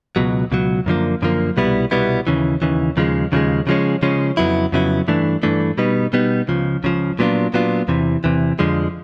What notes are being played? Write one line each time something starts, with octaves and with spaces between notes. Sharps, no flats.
C#2 B2 F#3
C#2 B2 F#3
F#2 D3 F3 A#3
F#2 D3 F3 A#3
C2 B2 G3 B3 E4
C2 B2 G3 B3 E4
D#2 C#3 E3
D#2 C#3 E3
D#2 C#3 F3 G#3
D#2 C#3 F3 G#3
C#3 F3 G#3 C#4
C#3 F3 G#3 C#4
F2 C#3 F#3 B3 E4
F2 C#3 F#3 B3 E4
G2 E3 A3 D4
G2 E3 A3 D4
B2 G3 B3 D#4
B2 G3 B3 D#4
C#2 C#3 F3
C#2 C#3 F3
A#2 F#3 B3 D4 F4
A#2 F#3 B3 D4 F4
E2 C3 E3
E2 C3 E3
F2 D3 F3 G#3